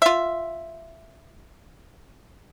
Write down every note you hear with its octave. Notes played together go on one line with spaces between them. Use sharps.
F4 E5